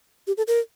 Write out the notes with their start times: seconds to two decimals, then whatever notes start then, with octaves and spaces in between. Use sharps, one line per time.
0.27 G4
0.37 A4
0.48 A#4